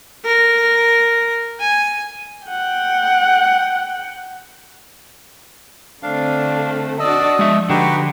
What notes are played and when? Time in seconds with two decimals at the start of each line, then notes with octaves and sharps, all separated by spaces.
0.25 A#4
1.60 G#5
2.46 F#5 G5
6.03 D3 A3 C4 D4 F5
6.99 D4 F#4 D5 D#5 E6
7.39 F3 G#3 E5
7.69 D3 D#4 F#4 G4 B4